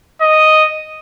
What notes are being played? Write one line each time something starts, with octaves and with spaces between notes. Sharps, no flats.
D#5